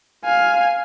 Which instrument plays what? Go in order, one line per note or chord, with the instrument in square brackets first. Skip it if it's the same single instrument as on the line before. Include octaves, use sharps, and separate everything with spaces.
[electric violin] F5 G#5